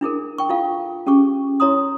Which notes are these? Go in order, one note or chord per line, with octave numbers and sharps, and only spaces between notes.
D4 E4 G#4 A#4
G5 C#6
E4 F4 A4 F5
C#4 G4 G#4 C#6
E4 C#5 A#5 C6 D#6